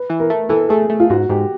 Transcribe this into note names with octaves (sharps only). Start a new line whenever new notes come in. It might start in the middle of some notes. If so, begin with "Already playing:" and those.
Already playing: B4
E3
A#4
A3
E3 A4
A3 G#4
A3
F4
G#2 F#4
G#2 G4